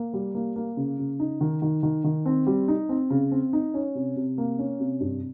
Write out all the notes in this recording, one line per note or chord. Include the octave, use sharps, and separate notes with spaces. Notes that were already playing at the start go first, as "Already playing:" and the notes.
Already playing: A#3
G3
A#3
A#3
C#3
C#3
D#4
D#3
D#3
D#3
D#3
C4
G3
D#4
C4
C#3
C4
D#4
C#4
C3
C3
A#3
C#4
C3
G2